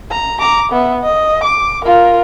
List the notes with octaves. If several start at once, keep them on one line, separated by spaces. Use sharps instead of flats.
A#5
A#5 D6
B3 E5
D#5
D6
F4 A#4